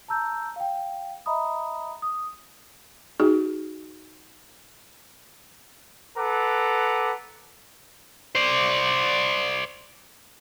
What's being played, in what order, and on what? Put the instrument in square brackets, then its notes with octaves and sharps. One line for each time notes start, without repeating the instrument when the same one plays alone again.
[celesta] A5 A#5 E6 G6
F5 G5
D#5 E5 A#5 B5 D#6
D#6
[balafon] D#4 F#4 G#4
[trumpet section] A4 B4 F#5 A#5 D6
[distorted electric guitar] C5 D5